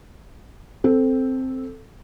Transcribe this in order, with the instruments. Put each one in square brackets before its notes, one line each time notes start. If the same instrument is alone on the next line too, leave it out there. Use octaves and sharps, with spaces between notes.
[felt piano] C4 A4